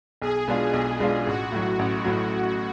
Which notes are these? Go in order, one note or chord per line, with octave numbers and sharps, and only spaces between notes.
B1 G#4
B2 G#3 D4 F4
B1 G#4
B2 G#3 D4 F4
A1 F#4
A2 F#3
A1
A2 F#3